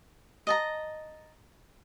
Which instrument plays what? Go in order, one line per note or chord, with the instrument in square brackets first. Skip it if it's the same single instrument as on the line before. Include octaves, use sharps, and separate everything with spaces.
[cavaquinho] D#5 A5 A#5